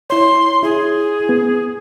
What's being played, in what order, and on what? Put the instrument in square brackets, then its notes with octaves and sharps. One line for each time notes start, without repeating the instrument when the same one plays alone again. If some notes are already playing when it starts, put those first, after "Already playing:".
[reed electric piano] E4 C#5 [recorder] C6
[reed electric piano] E4 [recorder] G#4
[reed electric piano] B3